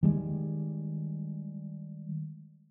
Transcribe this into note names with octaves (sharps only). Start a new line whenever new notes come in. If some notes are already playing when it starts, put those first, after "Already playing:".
D#3 G3 G#3